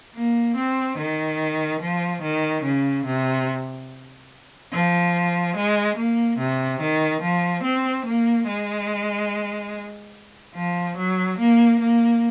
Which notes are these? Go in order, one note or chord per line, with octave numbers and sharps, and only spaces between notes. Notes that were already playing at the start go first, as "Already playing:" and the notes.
A#3
C4
D#3
F3
D#3
C#3
C3
F3
G#3
A#3
C3
D#3
F3
C4
A#3
G#3
F3
F#3
A#3
A#3